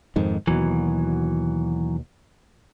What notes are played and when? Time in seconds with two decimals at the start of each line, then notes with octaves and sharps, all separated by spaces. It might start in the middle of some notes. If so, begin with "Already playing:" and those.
0.16 F2 G#2 D#3
0.47 D#2 B2 E3 F#3